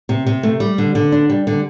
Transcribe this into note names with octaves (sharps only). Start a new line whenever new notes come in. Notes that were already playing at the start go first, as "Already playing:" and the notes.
C3
C3
A3
G3
D3
D3
D4
G3
D3